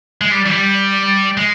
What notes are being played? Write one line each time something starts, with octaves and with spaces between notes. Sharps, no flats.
G#3
G3
E3
G3
G#3